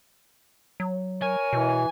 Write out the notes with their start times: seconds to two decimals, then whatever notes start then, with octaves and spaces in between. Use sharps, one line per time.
0.80 F#3
1.22 A#4 C#5 G#5
1.53 B2 E3